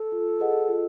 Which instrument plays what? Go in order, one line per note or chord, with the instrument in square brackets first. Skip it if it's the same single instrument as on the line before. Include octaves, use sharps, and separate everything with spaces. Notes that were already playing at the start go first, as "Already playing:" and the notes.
Already playing: [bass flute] A4
[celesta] F4
G#4 B4 D#5 F#5
F4